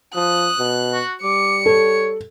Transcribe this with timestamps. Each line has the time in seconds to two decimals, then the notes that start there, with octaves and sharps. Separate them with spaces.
0.15 F3 D#6 F#6
0.59 B2
0.93 F#4
1.23 G3 D6 C#7
1.66 A4 C#5